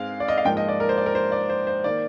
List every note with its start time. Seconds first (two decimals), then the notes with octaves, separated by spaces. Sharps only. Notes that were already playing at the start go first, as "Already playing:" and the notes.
Already playing: G#2 G#3 C4 F5
0.20 D5
0.28 D#5
0.38 F5
0.45 G#2 F3 A#3 F4 G5
0.57 D#5
0.68 D5
0.80 A#4
0.89 C5
0.98 D5
1.06 A#4
1.15 C5
1.32 D5
1.49 C5
1.67 C5
1.84 D#3 A#3 D5